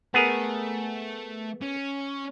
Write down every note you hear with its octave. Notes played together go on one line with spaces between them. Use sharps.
A3 B3 G#4 A#4
C#4